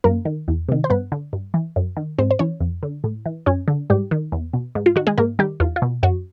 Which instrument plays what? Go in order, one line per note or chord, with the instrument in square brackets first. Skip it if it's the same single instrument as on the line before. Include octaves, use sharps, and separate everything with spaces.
[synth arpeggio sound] F#2 A#3 A#4
D#3
E2
C3 D#3
C5
G2 B3 B4
D3
G2
E3
F#2
D#3
G#2 C4 C5
C5
E3 C#4 C#5
F2
D3
A2
E3
F#2 C#4 C#5
D3
G#2 G3 G4
D#3
E2
B2
G#2
F4
D#3 F#4
G#3 G#4
G#2 A#3 A#4
D#3 G3 G4
E2 F4
F4
B2
F#2 F#4